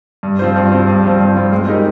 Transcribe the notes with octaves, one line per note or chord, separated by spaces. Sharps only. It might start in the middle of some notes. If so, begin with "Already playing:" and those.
G2
F3 C4 F4 C5
G2
F3 C4 F4 C5
G2
F3 C4 F4 C5
G2
F3 C4 F4 C5
G#3
C4 D#4 G4 A#4